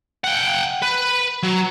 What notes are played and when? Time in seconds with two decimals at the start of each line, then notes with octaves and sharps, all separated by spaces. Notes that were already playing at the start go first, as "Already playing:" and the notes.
0.24 F#5 G5
0.82 B4
1.43 F#3